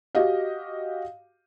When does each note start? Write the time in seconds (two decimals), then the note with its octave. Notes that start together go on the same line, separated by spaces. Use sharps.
0.15 F#4 G4 D#5 F5